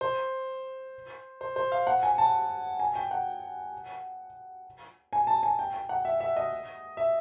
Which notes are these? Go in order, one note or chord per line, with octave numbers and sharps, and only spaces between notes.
C5
C5
C5
F5
F#5
G#5
A5
G#5
G5
F#5
G#5
A5
G#5
G5
G5
F#5
E5
E5
D#5
E5